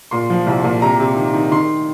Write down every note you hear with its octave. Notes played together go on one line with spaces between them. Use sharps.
A#2 C6
F3
C2
A#2
C3 A#5
C3
D#3
D#3
D#3 C6